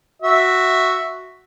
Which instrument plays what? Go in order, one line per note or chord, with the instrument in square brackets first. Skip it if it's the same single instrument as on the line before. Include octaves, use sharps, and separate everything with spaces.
[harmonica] F#4 E5